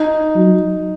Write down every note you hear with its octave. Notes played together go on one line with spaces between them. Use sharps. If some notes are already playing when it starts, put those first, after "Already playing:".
Already playing: D#4
F#3